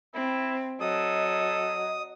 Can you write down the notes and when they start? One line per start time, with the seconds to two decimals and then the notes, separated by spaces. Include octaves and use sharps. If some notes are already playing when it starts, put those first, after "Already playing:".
0.14 C4 E4
0.81 F#3 A4 D#5 D#6